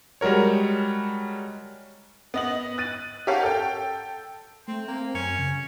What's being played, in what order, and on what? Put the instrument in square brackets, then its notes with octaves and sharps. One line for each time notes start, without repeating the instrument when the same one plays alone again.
[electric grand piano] G3 G#3 F#4 A#4 C#5
[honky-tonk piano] B3 D#5 F#7
F#6 A6 D#7
G4 A#4 C#5 F5 F#5 A5
A4 G5
[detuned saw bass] A3 [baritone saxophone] C4
[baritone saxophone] A#3 [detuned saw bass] C4
[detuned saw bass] F#2 [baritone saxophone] C#4
[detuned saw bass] C#3